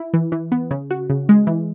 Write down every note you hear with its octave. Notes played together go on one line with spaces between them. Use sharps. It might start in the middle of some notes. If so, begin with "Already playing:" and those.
Already playing: E4
E3
E3
B3
C#3
F#4
C#3
G#3
E3